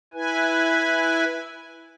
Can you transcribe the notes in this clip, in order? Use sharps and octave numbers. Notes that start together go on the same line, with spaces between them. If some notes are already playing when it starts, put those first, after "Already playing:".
E4 B4 G#5